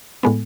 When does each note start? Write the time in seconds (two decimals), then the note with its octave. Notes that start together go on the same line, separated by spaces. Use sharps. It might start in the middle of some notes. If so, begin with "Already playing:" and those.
0.23 A2 G#3 B3